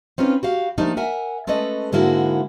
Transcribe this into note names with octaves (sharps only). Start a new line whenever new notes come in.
C4 C#4 D#4 F4 B4
F#4 G4 F5
F3 A3 A#3 D4 D#4 G4
A#4 E5 F#5 G#5
G#3 A3 C#4 A4 B4 D#5
G#2 D3 G#3 A#3 E4 F#4